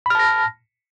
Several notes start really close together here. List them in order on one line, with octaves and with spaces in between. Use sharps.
B5 F6 A5 A#6